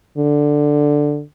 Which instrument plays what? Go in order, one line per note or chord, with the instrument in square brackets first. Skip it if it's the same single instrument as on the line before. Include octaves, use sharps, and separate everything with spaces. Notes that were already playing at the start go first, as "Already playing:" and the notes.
[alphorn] D3